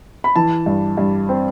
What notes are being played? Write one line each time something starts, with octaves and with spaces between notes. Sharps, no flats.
B5
E3 A5
G2
G2
C4